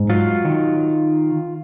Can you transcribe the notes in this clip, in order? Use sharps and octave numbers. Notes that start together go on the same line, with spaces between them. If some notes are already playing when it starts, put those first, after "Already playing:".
Already playing: G#2
F#3 F4
D#3